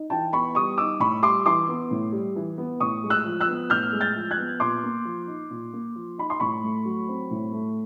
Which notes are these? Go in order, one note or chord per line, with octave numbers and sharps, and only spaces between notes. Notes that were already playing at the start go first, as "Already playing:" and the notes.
Already playing: D#4
E3 G5 A5
B3 B5 C#6
G3 C#6 D#6
D#4 D6 E6
A2 B5 C#6
G3 C6 D6
E3 C6 D6
B3
A2
G3
E3
B3
A2 C#6 D#6
G#3
E6 F#6
F3
E6 F#6
B3
A2 F6 G6
G#3
G6 A6
F3
F#6 G#6
B3
A#2 C6 D6
A#3
F3
D#4
A#2
A#3
F3
D#4 B5
C6
A2 B5 C#6
A3
F#3
C4
A2
A3